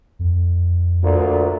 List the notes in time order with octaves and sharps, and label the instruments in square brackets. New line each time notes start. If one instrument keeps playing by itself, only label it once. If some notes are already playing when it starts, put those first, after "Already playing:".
[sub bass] F2
[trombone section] D2 A#2